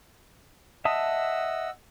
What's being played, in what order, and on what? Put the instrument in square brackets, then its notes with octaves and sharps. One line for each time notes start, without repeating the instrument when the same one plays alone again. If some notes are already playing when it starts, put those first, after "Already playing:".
[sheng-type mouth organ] D#5 F#5 E6 [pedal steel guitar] E5 A5 D#6